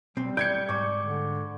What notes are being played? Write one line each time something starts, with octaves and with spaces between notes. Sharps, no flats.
B1 G3 C4
D5 G6 G#6 C#7
G#2 D5 C#6 D6
D3